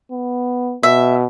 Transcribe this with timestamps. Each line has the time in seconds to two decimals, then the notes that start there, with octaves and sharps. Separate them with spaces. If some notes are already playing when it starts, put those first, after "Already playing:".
0.12 B3
0.83 B2 E5